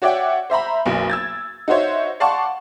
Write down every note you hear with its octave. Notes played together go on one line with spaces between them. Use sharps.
F#4 C#5 D5 E5 F#5 G5
C5 E5 A#5 B5
F#1 B1
E6 G#6 A6
D#4 F#4 C5 C#5 E5
D5 F5 F#5 A5 C6 C#6